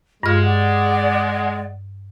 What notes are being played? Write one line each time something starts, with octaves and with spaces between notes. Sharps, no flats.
G2 G#3 F4 F6
D5 F#5